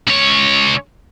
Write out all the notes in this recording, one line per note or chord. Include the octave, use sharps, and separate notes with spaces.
C#2 C#5